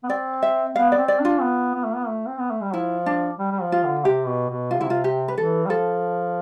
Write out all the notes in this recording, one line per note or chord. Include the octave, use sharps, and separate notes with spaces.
B3
C4 D5
E5
B3 F5
D5
C4
D5
D4 F4
B3
B3
A3
B3
A3
C4
B3
A3
G3
F3 E4
D4
G3
G3
F3
F4
D3
C3 G4
B2
B2
C3 F4
D3 E4
C3 F4
G4
B4
E3 A4
G3
F3 A4